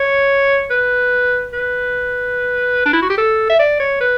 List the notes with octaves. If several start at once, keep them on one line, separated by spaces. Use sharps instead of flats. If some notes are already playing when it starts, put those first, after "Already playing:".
Already playing: C#5
B4
B4
D4
E4
F#4
G4
A4
E5
D5
C#5
B4